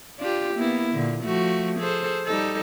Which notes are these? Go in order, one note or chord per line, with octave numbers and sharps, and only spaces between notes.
D4 F4 G4
A#3 B3 E4
A#2 D3
F3 A3 F#4
G#4 A4 C5
G3 D#4 A4